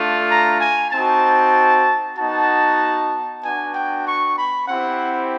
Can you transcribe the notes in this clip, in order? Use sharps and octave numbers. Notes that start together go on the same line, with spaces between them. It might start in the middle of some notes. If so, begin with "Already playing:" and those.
Already playing: A3 D4 F4
A#5
G#5
C4 D#4 F#4 A5
B3 D#4 F#4 A5
B3 D4 F#4 G#5
G5
C#6
B5
C4 E4 G4 F#5